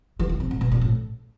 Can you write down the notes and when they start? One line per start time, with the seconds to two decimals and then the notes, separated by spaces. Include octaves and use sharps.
0.19 E3
0.29 D#3
0.40 C3
0.51 A#2
0.61 B2
0.71 A#2
0.81 A2